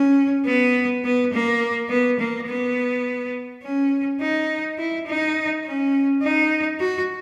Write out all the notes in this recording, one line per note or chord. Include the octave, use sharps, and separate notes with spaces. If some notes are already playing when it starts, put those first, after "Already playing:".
Already playing: C#4
B3
B3
A#3
B3
A#3
B3
C#4
D#4
E4
D#4
C#4
D#4
F#4